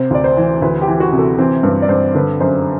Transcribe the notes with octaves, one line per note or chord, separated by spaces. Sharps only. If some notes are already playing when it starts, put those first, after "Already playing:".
Already playing: C3 C5
D2 D5
C5
E3
D2 B4
G4
E3
F#4
C3
A4
E3 C4
G2 B4
D5
G2 C5
D3 B4
F#2 C5